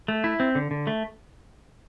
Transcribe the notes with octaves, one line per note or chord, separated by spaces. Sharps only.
A3
E4
C4
D3
D3
A3